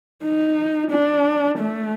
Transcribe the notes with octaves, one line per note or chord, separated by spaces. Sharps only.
D#4
D4
A3